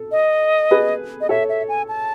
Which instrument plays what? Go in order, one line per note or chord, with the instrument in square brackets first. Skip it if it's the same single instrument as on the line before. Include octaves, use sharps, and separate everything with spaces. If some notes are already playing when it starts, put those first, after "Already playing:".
Already playing: [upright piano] A4
[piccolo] D#5
[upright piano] G#4 B4
[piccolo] D#5
[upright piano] A4 C#5 [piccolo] E5
[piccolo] E5
G#5
A5